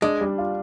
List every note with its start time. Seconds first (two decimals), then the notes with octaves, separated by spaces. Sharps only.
0.02 G#3 D4
0.21 G3
0.38 F4